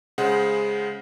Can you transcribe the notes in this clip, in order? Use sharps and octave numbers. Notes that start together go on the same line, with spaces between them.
C#3 G#3 C5 F#5